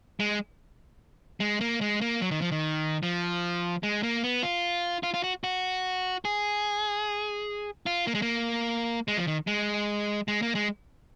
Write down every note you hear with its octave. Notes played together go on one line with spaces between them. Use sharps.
G#3
G#3
A#3
G#3
A#3
F#3
D#3
F3
D#3
F3
G#3
A#3
B3
F4
F4
F4
F#4
F#4
G#4
F4
A#3
G#3
A#3
G#3
F3
D#3
G#3
G#3
A#3
G#3